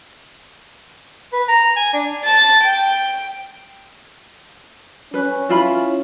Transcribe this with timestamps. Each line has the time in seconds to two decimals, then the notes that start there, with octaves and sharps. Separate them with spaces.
1.33 B4
1.48 A#5
1.77 G#5
1.93 D4
2.24 A5 A6
2.61 G5
5.14 C#4 B4
5.49 E4 F4 B5